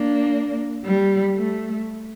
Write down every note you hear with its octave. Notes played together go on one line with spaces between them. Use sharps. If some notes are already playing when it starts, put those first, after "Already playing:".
Already playing: A#3 D4
G3
A3